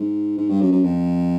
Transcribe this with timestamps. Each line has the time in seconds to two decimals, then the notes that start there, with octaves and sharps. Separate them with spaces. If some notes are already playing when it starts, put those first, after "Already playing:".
Already playing: G#2
0.37 G#2
0.49 G2
0.61 F#2
0.72 F#2
0.84 F2